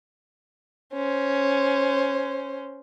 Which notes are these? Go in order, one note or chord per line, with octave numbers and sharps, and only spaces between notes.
C#4 C5